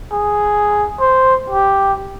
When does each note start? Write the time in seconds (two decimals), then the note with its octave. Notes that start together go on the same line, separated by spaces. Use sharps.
0.12 G#4
1.00 C5
1.50 G4